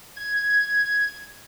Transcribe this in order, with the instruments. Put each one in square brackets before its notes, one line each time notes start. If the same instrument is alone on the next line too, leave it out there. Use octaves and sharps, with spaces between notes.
[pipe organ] G#6